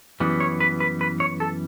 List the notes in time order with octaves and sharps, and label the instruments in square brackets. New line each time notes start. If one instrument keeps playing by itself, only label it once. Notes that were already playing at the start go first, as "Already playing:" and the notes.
[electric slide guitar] F#2 E3 G3 B3
C#5
B4
B4
B4
C#5
A4